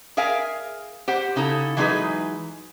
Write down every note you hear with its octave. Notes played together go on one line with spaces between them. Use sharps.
G#4 A#4 E5 F5 G#5
G4 C5 F#5
C#3 D#4 E4 A4
E3 F#3 G#3 D#4 G#4 B4